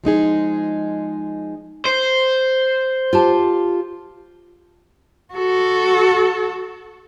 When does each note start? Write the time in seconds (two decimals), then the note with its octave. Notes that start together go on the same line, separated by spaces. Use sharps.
0.04 F3 G#3 D#4 G#4
1.86 C5
3.13 F4 G4 A5
5.34 F#4 A4